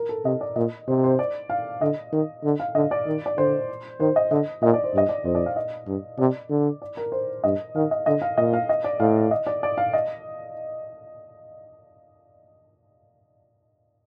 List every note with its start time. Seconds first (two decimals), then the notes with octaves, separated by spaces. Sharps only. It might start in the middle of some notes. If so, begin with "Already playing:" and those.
Already playing: A#4
0.09 A4
0.25 C3 D#5
0.41 D5
0.56 A#2 D#5
0.88 C3 C5
1.04 C5
1.19 D5
1.50 F5
1.81 D3 D#5
2.13 D#3
2.44 D3
2.60 F5
2.75 D3 D#5
2.91 D5
3.07 D#3
3.26 D5
3.37 D3 C5
4.00 D#3 C5
4.16 D#5
4.31 D3 D#5
4.62 A#2 D#5
4.74 D5
4.84 C5
4.94 G2 D#5
5.09 D5
5.25 F2 C5
5.35 D5
5.46 F5
5.56 D#5
5.87 G2
6.18 C3 D5
6.50 D3
6.82 D5
6.97 A#4
7.12 C5
7.44 G2 D#5
7.75 D#3 F5
7.91 D#5
8.06 D3 D#5
8.22 F5
8.37 A#2 D#5
8.53 F5
8.69 D#5
8.84 D5
9.00 A2 F5
9.31 D#5
9.47 D5
9.63 D5
9.78 F5
9.93 D#5